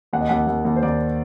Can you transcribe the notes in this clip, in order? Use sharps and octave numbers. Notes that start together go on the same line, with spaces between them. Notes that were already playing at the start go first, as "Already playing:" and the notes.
D#2 F#5
D#5
D#2 F#5
D#2
D#2
C5
D#2 D5